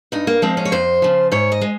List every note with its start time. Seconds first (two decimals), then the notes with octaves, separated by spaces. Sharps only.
0.12 G2 D#4
0.27 A#3
0.42 F3 G#3 C4
0.57 C#4
0.65 C#5
0.72 F2 C5
1.02 C#3 F3
1.32 G#2 C#5
1.52 D#5
1.61 G#3